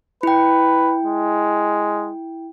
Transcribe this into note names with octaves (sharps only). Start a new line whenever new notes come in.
E4 B4 G5
G#3